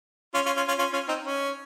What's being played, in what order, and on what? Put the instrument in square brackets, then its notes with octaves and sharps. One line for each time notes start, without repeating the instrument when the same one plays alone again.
[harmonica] C#4 F4
C#4 F4
C#4 F4
C#4 F4
C#4 F4
C#4 F4
C4 D#4
C#4